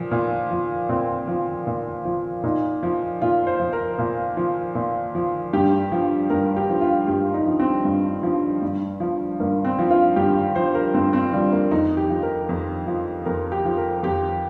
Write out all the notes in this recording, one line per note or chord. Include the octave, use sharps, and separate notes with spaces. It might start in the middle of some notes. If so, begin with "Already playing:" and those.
Already playing: A#2 F3
A#2
F3
A#2 C4
F3
A#2
F3
A#2 D#4
F3
A#2 F4
C5
F3
A#4
A#2
F3
A#2
F3
G2 G4
F3
G2 A#4
G4
F3
F4
G2 G4
D#4
F3
C4
G2
F3
G2
F3
G2 A#3
C4
F3
F4
G2 G4
F3 C5
A#4
G2 C4
C4
F3 G3
A#3
F2 D#4
G4
F3
A#4
F2
F3
F2 A#4
G4
F3
A#4
F2 G4